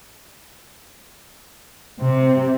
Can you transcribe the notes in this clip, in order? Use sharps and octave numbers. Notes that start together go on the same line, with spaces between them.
C3 C4